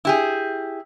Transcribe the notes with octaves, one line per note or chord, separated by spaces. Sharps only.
E4 G4 G#4